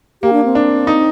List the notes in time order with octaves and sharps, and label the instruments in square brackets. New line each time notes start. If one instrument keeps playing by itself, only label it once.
[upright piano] A#3 [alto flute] G4
[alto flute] D4
C4
[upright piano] D4
D#4